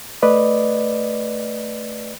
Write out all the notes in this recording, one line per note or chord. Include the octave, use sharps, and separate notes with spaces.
A3 B4 D5 D#5